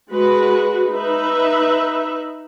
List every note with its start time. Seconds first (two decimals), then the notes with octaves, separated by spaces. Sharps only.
0.11 G#3 F#4 B4
0.90 D#4 B4 E5